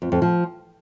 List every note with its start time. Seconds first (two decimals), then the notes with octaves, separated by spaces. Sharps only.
0.02 F2
0.12 F2
0.22 F3